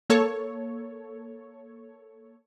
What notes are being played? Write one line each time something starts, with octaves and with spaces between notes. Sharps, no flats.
A#3 A4 C#5